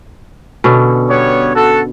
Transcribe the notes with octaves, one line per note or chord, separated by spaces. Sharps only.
B2 D3 C#4
G3 B3 C#5
F#4 A4